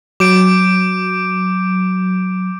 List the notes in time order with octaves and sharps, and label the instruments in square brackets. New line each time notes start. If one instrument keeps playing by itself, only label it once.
[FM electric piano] F#3 [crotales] D6 G6 D7